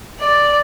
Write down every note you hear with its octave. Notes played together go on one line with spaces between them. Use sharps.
D5